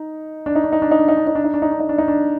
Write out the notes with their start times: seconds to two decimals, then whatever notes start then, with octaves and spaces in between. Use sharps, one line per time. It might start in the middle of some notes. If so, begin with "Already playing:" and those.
Already playing: D#4
0.46 D4
0.55 D#4
0.64 D4
0.72 D#4
0.82 D4
0.91 D#4
0.99 D4
1.08 D#4
1.17 D4
1.27 D#4
1.35 D4
1.44 D#4
1.54 D4
1.62 D#4
1.72 D4
1.80 D#4
1.89 D4
1.98 D#4
2.08 D4